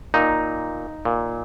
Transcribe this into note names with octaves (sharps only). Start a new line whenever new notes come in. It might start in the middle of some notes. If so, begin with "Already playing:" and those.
A#2 D#4
A#2